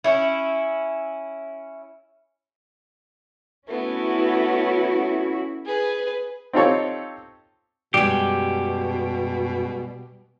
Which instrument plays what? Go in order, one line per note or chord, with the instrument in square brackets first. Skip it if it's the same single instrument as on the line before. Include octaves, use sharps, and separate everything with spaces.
[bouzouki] C#4 E4
[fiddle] A3 B3 [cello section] C#4 E4 F#4
[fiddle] G#4 B4
[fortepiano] C4 D#4 F4 G4 A4 C#5
[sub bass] F#2 [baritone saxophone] B2 [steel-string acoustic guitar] G3 G#3 [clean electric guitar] G4